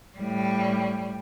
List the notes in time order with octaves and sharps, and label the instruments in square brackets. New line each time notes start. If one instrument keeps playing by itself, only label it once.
[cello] A2 G3